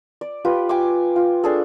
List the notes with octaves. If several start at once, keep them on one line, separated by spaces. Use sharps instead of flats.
D5
F4 G4 B4
G5 G#5 C#6 D6
F4
D4 G#4 A4